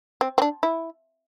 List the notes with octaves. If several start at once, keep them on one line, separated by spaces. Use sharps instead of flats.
C4
C4
D4
E4